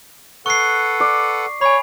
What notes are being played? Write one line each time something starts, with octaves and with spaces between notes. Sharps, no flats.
A4 B4 F#5 C#6 C7
D5
C#5 G#5 B5